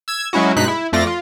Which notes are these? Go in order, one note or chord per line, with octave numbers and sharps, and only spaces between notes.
E6 G#6
F#3 G#3 C#4 E4 F#4
G2 B2 G#3 D#4 F#6 B6
E4
F2 A3 F4 D5 A#6
F4